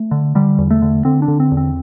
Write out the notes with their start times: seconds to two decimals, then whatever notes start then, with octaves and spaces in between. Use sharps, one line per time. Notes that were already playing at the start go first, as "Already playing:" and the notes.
Already playing: A3
0.11 D3
0.35 D3 G3
0.58 E2
0.71 A3
0.82 D3
1.05 D3 C4
1.22 D4
1.28 D3
1.40 C4
1.52 E2
1.57 C4